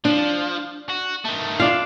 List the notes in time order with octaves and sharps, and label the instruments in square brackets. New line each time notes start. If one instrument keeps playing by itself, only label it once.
[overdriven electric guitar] F3 [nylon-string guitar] D4
[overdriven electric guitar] F#4
D#3 A3
[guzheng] D4 F5 [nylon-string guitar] F4